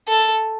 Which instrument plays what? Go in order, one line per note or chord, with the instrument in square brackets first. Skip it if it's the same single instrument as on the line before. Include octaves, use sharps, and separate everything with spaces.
[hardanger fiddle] A4